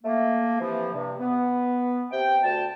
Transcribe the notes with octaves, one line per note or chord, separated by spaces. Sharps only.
A3 A#3
C3 E3 F3
G2 C3
B3
C3 G5
D2 G5 A5